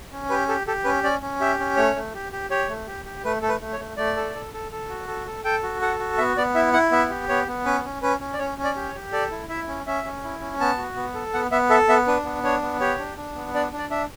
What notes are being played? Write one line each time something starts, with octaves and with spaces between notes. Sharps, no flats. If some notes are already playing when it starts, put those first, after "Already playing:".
C#4
G4 B4
G4 A4
G4 A4
C#4 B4
C#4 D5
C#4
G4 E5
C#4
A3 C#5
A3
G4
G4
G4 C#5
A3
G4
G4
A3 B4
A3 A4
B4
A3
C#5
A3
A3 D5
A4
A4
A4
A4
F#4
A4
A4
A4 G5
F#4
A4 F#5
F#4
B3 E5
B3 D5
E4 E5
E4 F#5
B3 E5
G4
B3 C#5
B3
C#4 B4
C#4
C#4 B4
C#4
D5
C#4 C#5
C#4
D5
G4
C#5
G4
A4 D5
E4
E4 E5
C#4
C#4 E5
C#4
E4
C#4
B3 A5
F#4
B3
A4
B3 F#5
B3 E5
A4 E5
B3 E5
D4 B4
B3
D4 C#5
B3
G4 C#5
D4
D4
B3
D4 D5
D4
D5
D4 E5